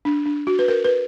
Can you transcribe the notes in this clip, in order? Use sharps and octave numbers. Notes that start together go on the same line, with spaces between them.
D4
D4
F#4
B4
A#4
B4